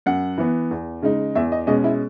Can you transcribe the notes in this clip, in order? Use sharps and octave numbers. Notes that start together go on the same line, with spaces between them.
F#2 F#5
E3 B3
E2
C#3 G#3 D#4
E2 E5
D#5
B2 G#3 C#4 D#5
E4